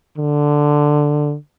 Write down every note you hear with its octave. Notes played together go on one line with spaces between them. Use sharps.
D3